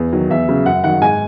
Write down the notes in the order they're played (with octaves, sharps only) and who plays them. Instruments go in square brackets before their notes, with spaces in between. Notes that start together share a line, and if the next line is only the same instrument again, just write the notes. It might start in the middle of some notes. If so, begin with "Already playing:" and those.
Already playing: [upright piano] E2
D#3 F#3
E2 E5
C#3 F#3
F#2 F#5
D#3 F#3 F#5
G#2 G#5